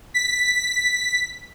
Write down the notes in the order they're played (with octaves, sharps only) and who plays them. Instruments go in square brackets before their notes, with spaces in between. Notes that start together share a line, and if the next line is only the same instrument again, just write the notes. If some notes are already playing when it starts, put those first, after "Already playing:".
[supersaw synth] B6